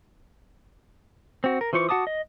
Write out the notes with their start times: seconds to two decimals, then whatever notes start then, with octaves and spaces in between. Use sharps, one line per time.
1.44 C4 F#4
1.61 A#4
1.73 E3 F4 C5 C#6 D6
1.89 F#4 F#5 A5 D6 D#6
2.07 D#5